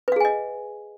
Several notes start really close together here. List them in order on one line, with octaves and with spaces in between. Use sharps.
B4 F5 G#4 G#5 D#5